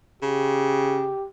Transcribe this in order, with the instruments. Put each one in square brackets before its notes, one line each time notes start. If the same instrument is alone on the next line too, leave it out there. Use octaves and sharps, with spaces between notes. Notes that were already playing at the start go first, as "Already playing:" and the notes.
[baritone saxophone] C#3 [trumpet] G4